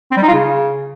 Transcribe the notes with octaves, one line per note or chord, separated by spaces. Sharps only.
C4
G3
D#4
F4
C#3